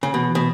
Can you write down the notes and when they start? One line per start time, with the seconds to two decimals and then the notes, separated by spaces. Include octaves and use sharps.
0.03 C#3
0.14 B2 E3
0.30 E3
0.35 B2